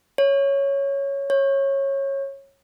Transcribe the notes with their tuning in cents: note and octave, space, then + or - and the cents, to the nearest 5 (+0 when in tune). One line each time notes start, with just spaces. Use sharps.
C#5 +0
C#5 -15